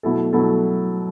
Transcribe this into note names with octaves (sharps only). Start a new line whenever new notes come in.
B2 F#3 A3 E4 A4
B2 F#3 A3 E4 A4